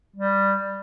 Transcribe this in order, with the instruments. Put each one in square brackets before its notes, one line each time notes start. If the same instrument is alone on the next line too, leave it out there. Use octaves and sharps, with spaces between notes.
[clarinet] G3